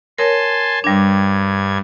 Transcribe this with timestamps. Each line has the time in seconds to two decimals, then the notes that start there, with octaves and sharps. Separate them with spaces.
0.18 A#4 C#5 G#5 A5 C6
0.84 G2 G3 D4 G#6